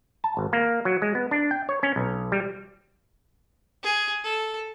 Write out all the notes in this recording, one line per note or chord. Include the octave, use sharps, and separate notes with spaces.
A5
G#1
A#3
F#3
G#3
B3
D4
G5
C#5
C#4
B1
G3
G#4
A4